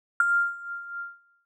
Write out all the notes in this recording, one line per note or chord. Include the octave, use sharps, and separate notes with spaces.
F6